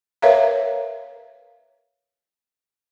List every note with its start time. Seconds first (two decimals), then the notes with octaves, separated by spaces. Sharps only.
0.22 A#4 B4 C#5 E5 F5 A#5